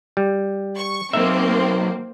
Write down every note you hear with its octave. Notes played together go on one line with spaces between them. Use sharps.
G3
C#6
F#3 A#3 C4 D#4 E5